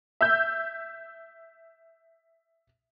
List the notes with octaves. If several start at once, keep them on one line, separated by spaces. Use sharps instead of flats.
E5 E6 G6